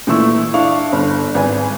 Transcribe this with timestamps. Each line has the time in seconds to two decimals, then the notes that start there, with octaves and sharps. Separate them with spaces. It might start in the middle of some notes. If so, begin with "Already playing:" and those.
0.07 A#2 E3 A3 E4 C#6 E6
0.54 D4 E4 F5 C#6
0.92 G1
1.35 G#1 B4 G#5